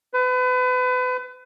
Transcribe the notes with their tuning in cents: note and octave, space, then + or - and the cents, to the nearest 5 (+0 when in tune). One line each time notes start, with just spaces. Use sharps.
B4 +35